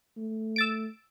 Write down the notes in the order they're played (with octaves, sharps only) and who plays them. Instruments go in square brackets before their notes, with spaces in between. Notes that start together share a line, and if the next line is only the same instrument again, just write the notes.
[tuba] A3
[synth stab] E6 A6 D7